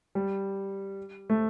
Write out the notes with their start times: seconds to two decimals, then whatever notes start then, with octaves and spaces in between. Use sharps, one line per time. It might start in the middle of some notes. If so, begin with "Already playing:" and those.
0.15 G3
1.30 A3